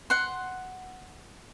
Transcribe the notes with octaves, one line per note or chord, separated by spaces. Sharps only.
F#5 C6